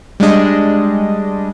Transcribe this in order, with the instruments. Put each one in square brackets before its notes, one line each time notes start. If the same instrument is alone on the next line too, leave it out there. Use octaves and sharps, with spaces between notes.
[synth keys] G3 G#3 D4 D#5